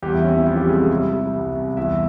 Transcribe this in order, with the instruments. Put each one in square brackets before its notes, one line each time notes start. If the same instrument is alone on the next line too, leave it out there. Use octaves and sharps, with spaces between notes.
[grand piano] E2 G3 G4
E4
C4 C#4
E4
F3 E4
G3 G4
C3 G#3 G#4
E4 E5
G3
G3
C2
C2
E2 E4 E5